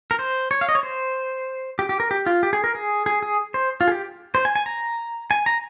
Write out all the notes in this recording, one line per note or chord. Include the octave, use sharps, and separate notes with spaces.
A#4
C5
C#5
F5
D#5
C#5
C5
G4
G4
A#4
G4
F4
G4
G#4
A#4
G#4
G#4
G#4
C5
F4
G#4
G4
C5
G#5
G#5
A#5
G#5
A#5